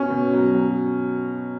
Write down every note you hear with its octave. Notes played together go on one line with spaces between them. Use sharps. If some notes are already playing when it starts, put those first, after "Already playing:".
Already playing: B2 C#4
B2
F#3
F#3